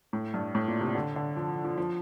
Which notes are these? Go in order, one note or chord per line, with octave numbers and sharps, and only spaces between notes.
A2
G2
A2
A#2
C3
D3
D3
F3
F3
F3